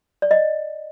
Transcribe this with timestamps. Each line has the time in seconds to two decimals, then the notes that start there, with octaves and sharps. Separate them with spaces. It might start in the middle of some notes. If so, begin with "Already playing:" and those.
0.22 D5
0.31 D#5